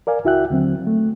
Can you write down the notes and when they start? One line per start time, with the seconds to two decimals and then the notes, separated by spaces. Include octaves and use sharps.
0.07 A#4 D5 F5 G#5
0.25 C#2 E4 F#4 E5 G5 F#6
0.50 D#2 D3 F#3 C4
0.87 A3